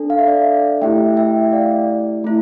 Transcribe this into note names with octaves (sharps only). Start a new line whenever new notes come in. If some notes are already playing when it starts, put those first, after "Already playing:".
Already playing: D4 A4
F5
E5
D5 F5
A3 E4 G4 E5 G5
E5 G5
D5 F5
A3 E4